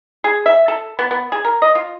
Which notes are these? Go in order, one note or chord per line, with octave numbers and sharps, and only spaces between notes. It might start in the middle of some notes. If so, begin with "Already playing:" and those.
G#4
E5
A4
B3
B3
G#4
A#4
D#5
F4